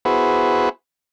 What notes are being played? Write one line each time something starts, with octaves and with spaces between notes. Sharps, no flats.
B3 E4 F#4 G#4 B4 C5